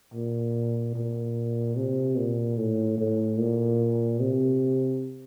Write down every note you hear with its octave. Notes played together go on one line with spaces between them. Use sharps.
A#2
A#2
C3
A#2
A2
A2
A#2
C3